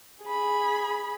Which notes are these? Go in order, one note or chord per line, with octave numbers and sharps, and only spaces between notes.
G#4 B5